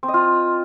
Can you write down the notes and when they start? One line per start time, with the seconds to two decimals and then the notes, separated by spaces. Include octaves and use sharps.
0.03 C4
0.08 D#5
0.14 F4